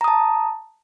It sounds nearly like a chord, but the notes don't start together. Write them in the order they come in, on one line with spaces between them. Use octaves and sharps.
A#5 D#6 A5